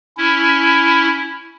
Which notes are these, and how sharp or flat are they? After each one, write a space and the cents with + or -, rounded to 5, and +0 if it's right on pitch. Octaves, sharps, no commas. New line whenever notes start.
C#4 +20 E4 +10